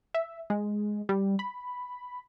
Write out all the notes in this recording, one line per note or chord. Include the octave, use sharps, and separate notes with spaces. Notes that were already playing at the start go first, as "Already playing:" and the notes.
E5
G#3
G3
B5